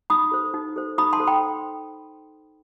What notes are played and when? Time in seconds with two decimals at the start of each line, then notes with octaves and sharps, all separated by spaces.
0.10 D#4 B5 D#6
0.32 A4 C5
0.54 D#4
0.76 A4 C5
0.98 D#4 B5 D#6
1.13 A5 C6
1.20 A4 C5
1.27 G5 B5